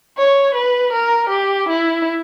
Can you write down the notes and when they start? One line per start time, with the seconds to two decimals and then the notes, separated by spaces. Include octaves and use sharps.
0.18 C#5
0.55 B4
0.93 A#4
1.29 G4
1.68 E4